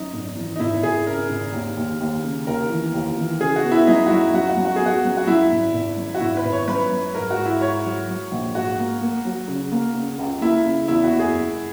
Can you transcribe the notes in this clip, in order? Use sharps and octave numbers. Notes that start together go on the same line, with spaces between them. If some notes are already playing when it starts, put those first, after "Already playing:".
Already playing: F#2 D#4
G#1
E3
D#4
G#1 E4
G#1 G#4
C#3 A#4
G#1
D#2
D#2
D#2
C#3
D#2 A#4
E3
D#2
E3
C#3 G#4
F#4
B3
E4
F#2 D#4
F#4
F#2 E4
F#2 F#4
F#4
F#2
F#4
G#4
B3 F#4
F#2
F#4
F#2 E4
G#1
G#1
F#2
F#4
G#1 E4
B4
G#1
C#5
F#2 B4
F#2
G#2 A#4
F#4
G#2
E4
G#2 C#5
F#3
F#3
A#1
G#2 F#4
A#3
A#3
F#3
C#3
A#3
C#3
C#2
A#3 E4
C#3
E2 E4
F#4
F#1
G#4
F#1